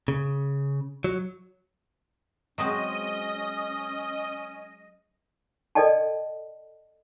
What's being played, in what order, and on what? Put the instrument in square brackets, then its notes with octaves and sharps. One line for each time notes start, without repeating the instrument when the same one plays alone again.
[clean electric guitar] C#3
F#3
[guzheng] F#3 G#3 C4 [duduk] C#4 [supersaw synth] D#5
[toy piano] A4 D5 D#5 G5 A5